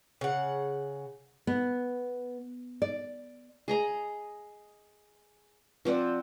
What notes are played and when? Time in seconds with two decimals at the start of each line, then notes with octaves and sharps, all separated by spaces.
0.21 C#3 F#5
1.47 B3
2.82 D5
3.68 G#4 D#5 A#5
5.85 F3 C4 D5 F#5